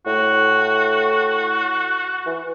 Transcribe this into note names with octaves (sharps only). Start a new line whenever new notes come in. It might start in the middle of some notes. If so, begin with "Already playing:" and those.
A2 F#4
E3